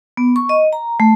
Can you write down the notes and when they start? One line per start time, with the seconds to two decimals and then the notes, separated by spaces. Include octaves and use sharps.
0.17 B3
0.36 C#6
0.49 D#5
0.73 A#5
1.00 A3